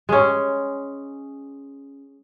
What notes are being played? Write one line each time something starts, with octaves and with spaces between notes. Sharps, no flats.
G#3 C#4